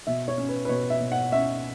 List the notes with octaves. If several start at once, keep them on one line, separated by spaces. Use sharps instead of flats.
B2 E5
C#5
C#4
B4
B4
B2 C#5
E5
B2
F#5
C#4 E5